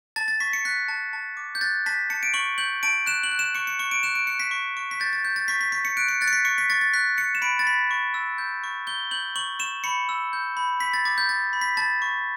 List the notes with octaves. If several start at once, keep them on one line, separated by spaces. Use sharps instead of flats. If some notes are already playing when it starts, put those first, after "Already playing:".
A5 A6
A6
C#6 B6
C#7
F#6 B6
A5
A5
D6
G6
F#6 A6
A5 B6
A5 C#7
D7
C#6 F#7
G6 F#7
A5 D7
F#6 E7
F#7
F#6
E7
C#6 C#7
C#7
C#6 C#7
D7
F#6 E7
D7
F#6 C#7
B6
C#6
C#6
B6
G6 A6
A6
G6
A6
C#6 B6
B6
C#6 B6
C#7
F#6 D7
C#7
F#6 A6
C#7
B6
C#6 C#7
B6
C#6 A6
A6
F#6 B6
F#6 C#7
E7
B5 D7
A6
B5 B6
C#6
E6
G6
C#6
G6 G7
G6 F#7
C#6 F#7
C#6 E7
B5 C#7
E6
G6
B5
B5 B6
A6
D6 A6
G6
G6 A6
B5
B6
A5 A6
C#6